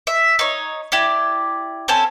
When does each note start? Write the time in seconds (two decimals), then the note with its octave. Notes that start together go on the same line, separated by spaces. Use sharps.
0.07 E5
0.39 D#4 C#5
0.92 E4 G4 D5
1.88 C4 C#4 A4 G#5